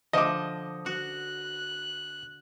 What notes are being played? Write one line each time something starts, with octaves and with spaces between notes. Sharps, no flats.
D3 F3 D#5 D6
F#4 F#6